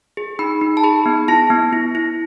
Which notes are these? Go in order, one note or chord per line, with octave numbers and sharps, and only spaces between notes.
G#4
D#4 B5
D#4
A5
G#4 B5
B3
E4 A5
B3
E4
E4